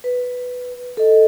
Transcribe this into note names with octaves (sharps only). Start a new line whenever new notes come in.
B4
A4 D#5